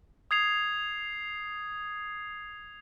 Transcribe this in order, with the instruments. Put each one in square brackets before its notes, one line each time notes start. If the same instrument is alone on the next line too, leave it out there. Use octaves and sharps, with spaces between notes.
[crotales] D#6 G#6 C7 F7